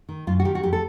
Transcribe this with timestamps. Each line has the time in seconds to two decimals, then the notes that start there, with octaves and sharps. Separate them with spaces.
0.09 D#3
0.27 F#2 F4
0.40 F#4
0.45 D#3 G4
0.55 F#4
0.63 F2 G4
0.73 A4